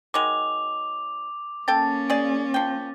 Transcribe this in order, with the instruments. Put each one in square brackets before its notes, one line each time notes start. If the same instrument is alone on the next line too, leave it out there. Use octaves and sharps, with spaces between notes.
[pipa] D#3 F#3 G#3 [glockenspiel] D6 F7
[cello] A#3 C#4 [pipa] A4 G5 A5 [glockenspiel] A6
[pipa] C#3 G#4 D5
F3 G5